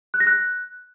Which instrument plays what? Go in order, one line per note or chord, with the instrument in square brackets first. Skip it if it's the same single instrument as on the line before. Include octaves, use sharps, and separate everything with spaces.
[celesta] F#6
A#6
F#6